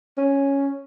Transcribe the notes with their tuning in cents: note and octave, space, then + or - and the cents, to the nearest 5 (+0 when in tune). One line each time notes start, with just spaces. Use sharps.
C#4 +0